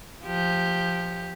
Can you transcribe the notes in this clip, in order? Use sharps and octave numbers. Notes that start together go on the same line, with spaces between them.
F3 G4